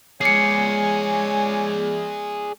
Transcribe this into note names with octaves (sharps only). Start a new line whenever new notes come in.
G#3 G#4 C#5 D5 G#5 C7 C#7